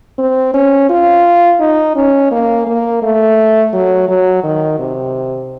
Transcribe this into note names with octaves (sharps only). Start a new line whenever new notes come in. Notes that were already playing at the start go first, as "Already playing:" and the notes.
C4
C#4
F4
D#4
C#4
A#3
A#3
A3
F#3
F#3
D#3
C3